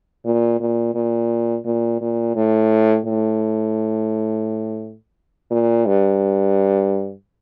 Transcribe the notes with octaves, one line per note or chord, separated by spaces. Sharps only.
A#2
A#2
A#2
A#2
A#2
A2
A2
A#2
G2